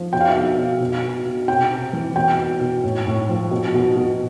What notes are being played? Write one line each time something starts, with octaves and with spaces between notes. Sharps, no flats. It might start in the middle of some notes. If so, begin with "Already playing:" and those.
Already playing: F3
B2 G5
F5
E5
B2 F5
B2
B2
B2
B2
C3 G5
C3
E3
B2 G5
B2
B2
A2
A2
F3
B2
B2
B2